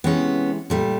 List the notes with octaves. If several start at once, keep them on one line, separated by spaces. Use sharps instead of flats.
C3 E3 G#3 B3 C#4
A#2 G3 A3